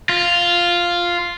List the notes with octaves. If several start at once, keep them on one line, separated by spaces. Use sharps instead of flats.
F4